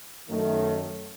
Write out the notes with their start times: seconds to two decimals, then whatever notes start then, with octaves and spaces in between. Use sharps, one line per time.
0.30 F#2 D#3 A3